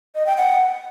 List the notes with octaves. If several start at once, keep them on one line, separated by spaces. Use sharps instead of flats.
D#5
G5
F#5